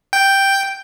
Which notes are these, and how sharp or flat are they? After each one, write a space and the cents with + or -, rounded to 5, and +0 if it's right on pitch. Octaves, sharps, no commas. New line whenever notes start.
G5 +0